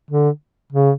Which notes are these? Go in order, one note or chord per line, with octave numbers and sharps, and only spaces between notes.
D3
C#3